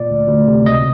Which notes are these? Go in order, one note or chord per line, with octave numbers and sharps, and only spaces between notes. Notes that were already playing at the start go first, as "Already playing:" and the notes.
Already playing: A#2 D5
D2
D2
C3
C#2 D#5